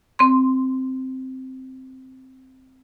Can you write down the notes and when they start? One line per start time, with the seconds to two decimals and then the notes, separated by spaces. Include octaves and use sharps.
0.19 C4 C6